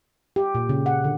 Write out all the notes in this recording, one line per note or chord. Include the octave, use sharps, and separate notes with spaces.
G4
A#2
C#3
F#5
D3